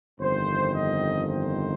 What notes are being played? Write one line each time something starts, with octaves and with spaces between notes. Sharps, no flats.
G1 F2 D#3 C4 C5
D#5
C5